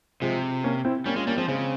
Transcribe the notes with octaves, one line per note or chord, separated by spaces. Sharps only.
C3 F3 G#3
A#3 C#4
C4 E4
G3 A#3 C#4
G#3 C#4 F4
G3 A#3 C#4
F3 G#3 C4
C#3 G#3 C4